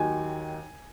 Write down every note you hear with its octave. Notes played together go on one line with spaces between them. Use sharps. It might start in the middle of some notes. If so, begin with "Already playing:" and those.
Already playing: D#2 D#3 F#3 G#5